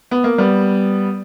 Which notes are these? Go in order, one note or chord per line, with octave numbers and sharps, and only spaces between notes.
B3
A#3
G3 B3